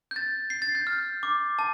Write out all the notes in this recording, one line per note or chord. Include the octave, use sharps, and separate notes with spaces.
G6
A6
C7
A6
G6
F6
D6
A5